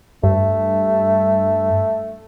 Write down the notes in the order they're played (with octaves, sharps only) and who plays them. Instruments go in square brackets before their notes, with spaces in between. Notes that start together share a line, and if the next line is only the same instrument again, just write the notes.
[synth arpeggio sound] G2 [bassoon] A3